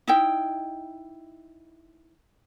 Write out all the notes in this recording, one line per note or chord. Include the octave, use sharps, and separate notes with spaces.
D#4 E4 G5